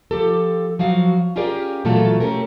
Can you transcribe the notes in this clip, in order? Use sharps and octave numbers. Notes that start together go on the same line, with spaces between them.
F3 G4 A4
F3 F#3 F#4 F5
C#4 F4 G4 G#4 A#4 D5
A#2 E3 F#3 A3 F4 A4
A3 A#3 C#4 G4 A#4